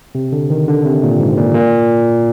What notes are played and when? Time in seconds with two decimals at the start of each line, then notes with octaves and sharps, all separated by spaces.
0.15 C3
0.32 D3
0.50 D#3
0.68 D3
0.85 C3
1.03 A#2
1.20 G#2
1.37 A#2
1.55 A#2